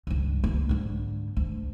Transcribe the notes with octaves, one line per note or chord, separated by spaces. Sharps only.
C#2 G2
C#2 A#3
G#2 D3
D2